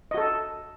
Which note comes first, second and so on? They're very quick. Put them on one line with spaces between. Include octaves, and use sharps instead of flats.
D#5 F#4 A4